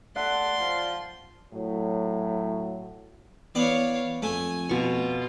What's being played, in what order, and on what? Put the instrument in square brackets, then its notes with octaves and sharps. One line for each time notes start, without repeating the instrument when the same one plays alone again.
[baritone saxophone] A3 [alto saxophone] D5 [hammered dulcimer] F#5 [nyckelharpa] C6
[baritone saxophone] F3
[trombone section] A2 F#3
[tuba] E3 [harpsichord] B3 D5 [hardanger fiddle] C#5 F5
[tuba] F2 [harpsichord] A3 [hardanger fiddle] G#5
[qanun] B2 C#6 [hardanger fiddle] F4